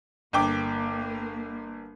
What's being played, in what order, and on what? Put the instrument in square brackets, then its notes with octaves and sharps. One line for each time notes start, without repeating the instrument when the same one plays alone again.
[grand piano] G1 G5 D6 [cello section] A#3